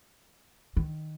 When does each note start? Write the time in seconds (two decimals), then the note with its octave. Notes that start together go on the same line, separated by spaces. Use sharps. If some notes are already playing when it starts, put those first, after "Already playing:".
0.77 D#3